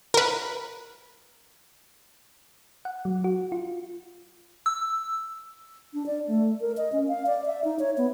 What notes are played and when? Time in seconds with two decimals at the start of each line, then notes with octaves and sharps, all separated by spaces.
0.14 A#4 B4
2.85 F#5
3.05 F#3
3.24 F#4
3.52 F4
4.66 E6
5.94 D4
6.06 D5
6.28 A3
6.60 A#4
6.77 D#5
6.92 C#4
7.08 F5
7.26 D5
7.46 E5
7.64 D#4
7.79 C#5
7.98 B3